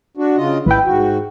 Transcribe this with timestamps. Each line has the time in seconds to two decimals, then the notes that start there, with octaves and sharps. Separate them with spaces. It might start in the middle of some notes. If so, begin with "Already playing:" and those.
0.17 D4 F#4
0.37 C#3 F4 D#5
0.66 A1 E4 B4 G5
0.85 G#2 F#4